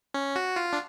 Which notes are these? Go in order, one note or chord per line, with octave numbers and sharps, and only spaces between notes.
C#4
F#4
F4
D4